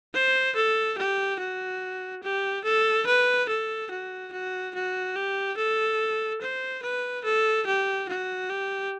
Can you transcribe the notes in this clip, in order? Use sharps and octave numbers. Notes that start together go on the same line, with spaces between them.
C5
A4
G4
F#4
G4
A4
B4
A4
F#4
F#4
F#4
G4
A4
C5
B4
A4
G4
F#4
G4